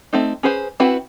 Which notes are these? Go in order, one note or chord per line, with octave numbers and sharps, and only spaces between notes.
A3 C4 D#4
C#4 G#4 B4 C5
C4 E4 F#4 B4